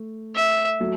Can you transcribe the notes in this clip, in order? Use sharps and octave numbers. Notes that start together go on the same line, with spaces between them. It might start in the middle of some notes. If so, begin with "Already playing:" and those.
Already playing: A3
E5
F#3 A3